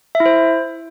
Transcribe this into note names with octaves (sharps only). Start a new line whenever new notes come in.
E5
E4
C5